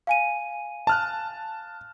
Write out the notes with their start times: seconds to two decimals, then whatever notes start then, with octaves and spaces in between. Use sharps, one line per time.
0.07 F5 G#5 D#7
0.87 A5 F6 F#6